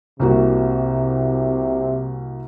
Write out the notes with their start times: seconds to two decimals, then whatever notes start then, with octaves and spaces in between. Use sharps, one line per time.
0.20 C2 C3 A#3 F#4